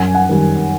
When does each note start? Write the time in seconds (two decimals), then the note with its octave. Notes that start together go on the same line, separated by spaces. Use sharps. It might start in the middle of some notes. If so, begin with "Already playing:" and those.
Already playing: F#2 F#5 G#5
0.15 F#5 G#5
0.29 D#3 G3